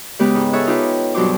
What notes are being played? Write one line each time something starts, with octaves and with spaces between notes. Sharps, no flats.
C#3 G#3 B3 G4 B4
G#2
G#4 A4 C#5 E5 C#6 F#6
D#4 F4 G4 B4
G2 B2 F#3 C5 D6